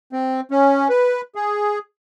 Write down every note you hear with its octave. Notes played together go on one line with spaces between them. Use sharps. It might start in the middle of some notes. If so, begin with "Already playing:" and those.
C4
C#4
B4
G#4